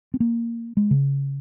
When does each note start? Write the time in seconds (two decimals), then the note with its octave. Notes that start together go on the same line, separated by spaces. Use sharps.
0.14 C4
0.20 A#3
0.77 G#3
0.91 C#3